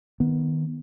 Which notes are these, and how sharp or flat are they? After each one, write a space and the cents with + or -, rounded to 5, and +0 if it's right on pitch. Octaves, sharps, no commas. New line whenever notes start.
D#3 +0 B3 -10